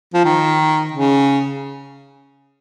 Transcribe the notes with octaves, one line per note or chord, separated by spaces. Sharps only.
F3
D#3
C#3